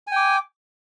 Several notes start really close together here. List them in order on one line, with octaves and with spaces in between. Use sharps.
G#5 G5 D6